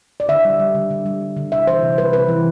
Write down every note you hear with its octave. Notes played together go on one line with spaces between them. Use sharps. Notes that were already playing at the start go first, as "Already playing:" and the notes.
D5
D3 E5
G3
G3
D3
D3
G3
G3
D3
C3 E5
E3 C5
C3
G3 B4
C3 B4
E3